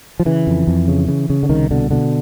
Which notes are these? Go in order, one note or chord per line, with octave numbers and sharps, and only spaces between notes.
F3
C#3 E3
F2
F2
C#3
C#3
C#3
D3
C2 D#3
B2 D3
B2 D3